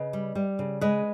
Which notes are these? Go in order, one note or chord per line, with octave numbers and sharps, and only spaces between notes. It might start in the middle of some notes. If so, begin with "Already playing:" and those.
Already playing: C#3 B4 D#5
G3
G3
C#3
G#3 B4 D#5